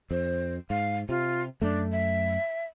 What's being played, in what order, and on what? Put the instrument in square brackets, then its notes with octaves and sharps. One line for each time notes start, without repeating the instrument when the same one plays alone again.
[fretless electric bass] F2 [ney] C5
[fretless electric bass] G#2 [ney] F5
[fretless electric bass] C3 [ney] F4
[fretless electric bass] F#2 A3 [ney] D4
[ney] E5